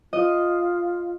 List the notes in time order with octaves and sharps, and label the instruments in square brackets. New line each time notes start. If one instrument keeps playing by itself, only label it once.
[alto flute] F4 [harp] D#5